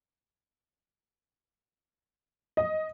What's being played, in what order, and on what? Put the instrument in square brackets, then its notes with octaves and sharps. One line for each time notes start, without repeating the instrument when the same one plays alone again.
[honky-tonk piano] D#5